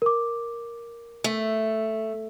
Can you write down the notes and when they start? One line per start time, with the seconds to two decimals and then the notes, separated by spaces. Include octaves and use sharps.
0.02 A#4 D6
1.24 A3